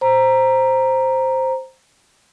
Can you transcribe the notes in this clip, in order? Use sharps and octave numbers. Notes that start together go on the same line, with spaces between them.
C5 A#5